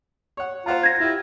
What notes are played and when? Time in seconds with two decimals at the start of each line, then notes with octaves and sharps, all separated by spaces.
0.37 C#5 F#5
0.66 F4 C5 F#5 A#5
0.83 G#6 A#6
1.00 E4 F4 G4